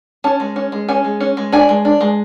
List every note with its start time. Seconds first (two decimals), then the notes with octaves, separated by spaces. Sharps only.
0.24 C#4 A5
0.40 G#3
0.56 C#4
0.72 G#3
0.89 C#4 G#5
1.04 G#3
1.20 C#4
1.37 G#3
1.52 D4 G#5
1.69 G#3
1.85 D4
2.01 G#3